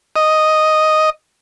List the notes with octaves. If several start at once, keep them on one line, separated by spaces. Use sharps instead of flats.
D#5